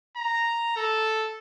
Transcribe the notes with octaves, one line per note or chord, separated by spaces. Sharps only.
A#5
A4